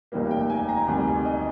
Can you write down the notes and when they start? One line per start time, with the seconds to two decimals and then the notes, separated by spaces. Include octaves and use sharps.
0.12 F1 D#2 D#3 G3 A#3
0.31 G5
0.50 G#5
0.69 A#5
0.87 D2 C3 D#3 G3 G#5
1.06 G#5
1.25 D#5